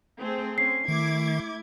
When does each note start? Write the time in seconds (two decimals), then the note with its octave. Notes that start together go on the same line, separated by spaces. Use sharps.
0.20 A3 C4 G#4
0.58 C#4 C7
0.88 D#3 A3 E4 D6 G#6